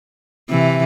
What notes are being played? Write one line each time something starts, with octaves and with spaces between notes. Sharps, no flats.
C3 E3